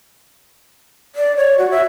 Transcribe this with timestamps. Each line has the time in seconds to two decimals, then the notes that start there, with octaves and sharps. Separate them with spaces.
1.15 D5
1.37 C#5
1.58 F#4
1.71 E5